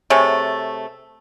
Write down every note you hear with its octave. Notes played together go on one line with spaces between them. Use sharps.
C3 A3 G#4 C#5